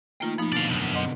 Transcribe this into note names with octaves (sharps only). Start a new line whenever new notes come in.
A3 A#3 D#4 F4 G5
F3 A3 A#3 D#4 B5
B2 D3 D5 F5
B1 F#2
D#5 F#5 C6